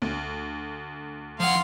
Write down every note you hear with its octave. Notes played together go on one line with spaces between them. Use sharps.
D2
F3 F5 F#5 C6